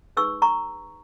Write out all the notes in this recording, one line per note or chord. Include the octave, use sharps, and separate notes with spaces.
D#4 G#4 B4 C#6 E6
A#5 C#6